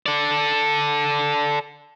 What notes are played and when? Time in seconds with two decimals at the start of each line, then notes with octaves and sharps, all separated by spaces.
0.06 A4 D5